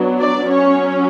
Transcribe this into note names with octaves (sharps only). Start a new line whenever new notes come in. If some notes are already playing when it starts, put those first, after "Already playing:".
Already playing: F#3 B3 D4
D5
F#3 C#4 C#5